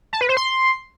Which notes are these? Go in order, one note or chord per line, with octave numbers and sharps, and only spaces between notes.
A5
B4
C5
C6